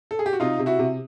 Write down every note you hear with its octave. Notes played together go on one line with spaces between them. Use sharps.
A4
G#4
G4
F#4
C3 D#4 F4
C3
E4 F#4
C3